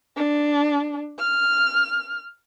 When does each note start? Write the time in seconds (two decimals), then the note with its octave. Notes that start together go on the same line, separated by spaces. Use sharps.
0.17 D4
1.19 F6